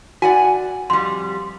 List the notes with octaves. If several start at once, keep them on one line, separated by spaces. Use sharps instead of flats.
F#4 D5 F#5 G#5
F2 G3 C6